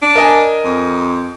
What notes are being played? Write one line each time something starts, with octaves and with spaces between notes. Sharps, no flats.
D4
A#4 D#5 G#5
F2